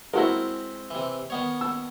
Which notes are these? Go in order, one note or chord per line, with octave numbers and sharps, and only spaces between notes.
G#3 C4 E4 F#4 A#4
C3 E3
D#3 B3 C#5
E6